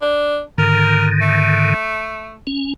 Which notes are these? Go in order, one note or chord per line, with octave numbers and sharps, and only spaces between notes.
D4
G#2 D3 D#3 A#4
A3
C#4